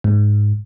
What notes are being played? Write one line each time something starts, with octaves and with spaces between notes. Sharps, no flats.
G#2